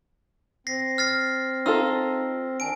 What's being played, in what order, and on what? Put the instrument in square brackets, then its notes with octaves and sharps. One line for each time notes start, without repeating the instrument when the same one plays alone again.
[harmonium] C4 [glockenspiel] A#6 C7
[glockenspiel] F6 A6 C7
[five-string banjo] D#4 F4 A4 [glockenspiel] E6
[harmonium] D#3 D4 [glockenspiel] G#5 D7